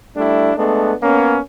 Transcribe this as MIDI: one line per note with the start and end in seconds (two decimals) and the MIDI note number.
0.17 0.50 55
0.17 0.50 57
0.17 0.50 62
0.17 0.50 64
0.56 0.93 56
0.56 0.93 57
0.56 0.93 59
0.56 0.93 62
1.02 1.39 58
1.02 1.39 59
1.02 1.39 61